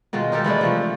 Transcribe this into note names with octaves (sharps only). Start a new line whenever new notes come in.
B2 D#3 G#3 F4
D#4 G4 A4 A#4
E3 G#3 A3 D4
C3 F3 A3